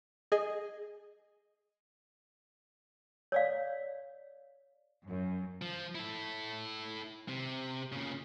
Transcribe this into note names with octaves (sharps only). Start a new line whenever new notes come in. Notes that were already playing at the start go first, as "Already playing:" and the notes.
G#4 D#5 G#5
C#5 D5 F5
F#2
F3
E4 A4
C3
A#2 C#3